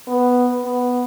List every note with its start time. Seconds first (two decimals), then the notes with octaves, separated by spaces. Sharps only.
0.08 B3
0.65 B3